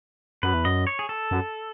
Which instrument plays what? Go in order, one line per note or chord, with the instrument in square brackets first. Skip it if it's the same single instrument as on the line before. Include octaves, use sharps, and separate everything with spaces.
[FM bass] F#2 [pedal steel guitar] B4
[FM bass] E2
[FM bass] F#2 [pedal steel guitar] D#5
[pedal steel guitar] C#5
G#4
A4
[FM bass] F#2